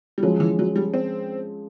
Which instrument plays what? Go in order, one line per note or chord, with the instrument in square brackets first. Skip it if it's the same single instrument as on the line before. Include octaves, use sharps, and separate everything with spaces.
[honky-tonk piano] G3
[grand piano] F3 G#3 C#4 [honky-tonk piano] F#3
[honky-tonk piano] E3
F#3
G3
C4